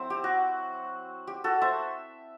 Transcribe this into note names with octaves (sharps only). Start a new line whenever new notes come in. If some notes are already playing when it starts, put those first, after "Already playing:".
Already playing: F#3 C4 E4 C5 E5
G4
F#4
G4
F#4 A4
C5 E5